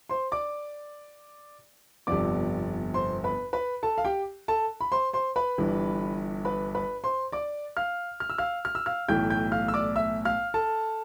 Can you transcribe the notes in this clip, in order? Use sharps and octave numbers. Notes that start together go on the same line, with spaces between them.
C5 C6
D5 D6
G1 F2 C3 F3 B3 D5 D6
C5 C6
B4 B5
B4 B5
A4 A5
F5
G4 G5
A4 A5
B5
C5 C6
C5 C6
B4 B5
G1 G2 E3
B4 B5
B4 B5
C5 C6
D5 D6
F5 F6
F6
E6
F5 F6
F6
E6
F5 F6
B1 A2 E3 A3 G5 G6
G5 G6
F5 F6
E6
D5 D6
E5 E6
F5 F6
A4 A5